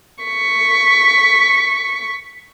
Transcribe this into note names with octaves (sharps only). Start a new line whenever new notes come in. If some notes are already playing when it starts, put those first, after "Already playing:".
C#6 B6